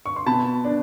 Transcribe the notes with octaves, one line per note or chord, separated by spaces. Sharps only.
C#6
C6
B2 A5 B5
D4